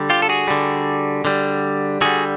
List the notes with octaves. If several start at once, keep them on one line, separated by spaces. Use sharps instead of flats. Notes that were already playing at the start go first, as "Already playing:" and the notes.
Already playing: D3 G3
F4 G4
A4
F#4 G#4
D3 G3
D3 G3
D3 G3 F#4 G#4